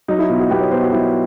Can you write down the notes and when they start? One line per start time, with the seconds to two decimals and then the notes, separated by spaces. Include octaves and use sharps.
0.08 F#3 D#4
0.19 E4
0.29 B2 F4
0.40 F#4
0.51 B3 G4
0.61 C#5
0.71 B2 C5
0.82 F#4
0.92 F#3 E4